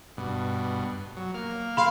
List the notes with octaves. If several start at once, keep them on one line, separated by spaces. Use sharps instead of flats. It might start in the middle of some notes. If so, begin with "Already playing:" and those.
G2 B2
F#3
A#3 F6
F5 B5 C6